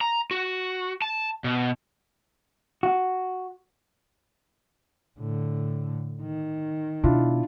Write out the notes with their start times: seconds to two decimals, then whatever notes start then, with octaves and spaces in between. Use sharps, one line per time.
0.01 A#5
0.31 F#4
1.02 A5
1.44 B2
2.83 F#4
5.19 A2 D3
6.22 D#3
7.04 B2 D4 E4 F4